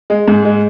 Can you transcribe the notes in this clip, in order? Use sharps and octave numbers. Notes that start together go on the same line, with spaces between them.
G#3
G#2
G#3